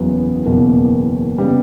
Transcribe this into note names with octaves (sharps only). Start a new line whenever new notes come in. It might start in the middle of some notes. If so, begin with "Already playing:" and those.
Already playing: F#1 E2 C#3 F#3 B3
F#1 E2 B2 A#3
C#3 G3 B3